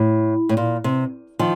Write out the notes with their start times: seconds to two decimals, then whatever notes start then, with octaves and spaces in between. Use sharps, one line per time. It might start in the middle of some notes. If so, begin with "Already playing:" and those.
Already playing: A2
0.49 A2
0.57 A#2
0.84 C3
1.39 D#3 F3